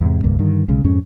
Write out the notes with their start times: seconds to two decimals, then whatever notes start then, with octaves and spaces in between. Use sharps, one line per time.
0.01 E2 G#2 C3
0.23 D#1 C#2 G2 A#3
0.39 G2 D3 D#3
0.68 B1 C#3 G#3
0.84 F2 G#2 G#3 C#4